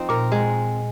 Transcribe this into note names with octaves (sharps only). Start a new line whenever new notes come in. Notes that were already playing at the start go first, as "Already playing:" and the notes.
Already playing: F3 C4 D#4
A#2 A#4
G#3